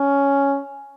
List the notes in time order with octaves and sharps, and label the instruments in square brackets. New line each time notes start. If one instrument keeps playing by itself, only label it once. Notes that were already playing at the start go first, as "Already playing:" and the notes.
Already playing: [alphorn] C#4